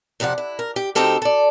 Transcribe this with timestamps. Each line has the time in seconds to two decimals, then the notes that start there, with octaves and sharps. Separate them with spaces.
0.20 F2 C3 F3 D5 F#5
0.38 E4
0.59 A#4
0.76 G4
0.95 D2 C4 D#4 G4 A4 A#4
1.22 A4 D5